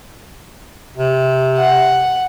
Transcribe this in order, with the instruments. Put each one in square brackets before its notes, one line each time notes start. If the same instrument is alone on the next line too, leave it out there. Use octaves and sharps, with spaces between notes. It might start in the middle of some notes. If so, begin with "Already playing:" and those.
[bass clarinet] C3
[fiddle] F#5